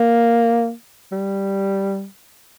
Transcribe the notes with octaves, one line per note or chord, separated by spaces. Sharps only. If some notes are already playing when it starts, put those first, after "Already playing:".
Already playing: A#3
G3